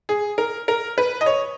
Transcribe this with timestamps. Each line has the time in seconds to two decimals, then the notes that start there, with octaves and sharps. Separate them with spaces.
0.09 G#4
0.38 A#4
0.68 A#4
0.98 B4
1.21 D#5
1.26 C#5